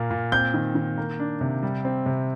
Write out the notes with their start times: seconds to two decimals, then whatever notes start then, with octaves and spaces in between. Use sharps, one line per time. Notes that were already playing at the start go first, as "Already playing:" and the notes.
Already playing: A#2 A#3
0.11 A#2
0.32 C4 G6
0.54 D#3
0.75 D#3
0.97 A#3
1.20 D4
1.41 C3
1.63 G3
1.85 C4
2.06 C3